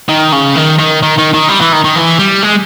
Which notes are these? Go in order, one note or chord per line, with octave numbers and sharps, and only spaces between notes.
D#3
C#3
D#3
D#3
D#3
D#3
D#3
G3
E3
D#3
D#3
E3
G3
G#3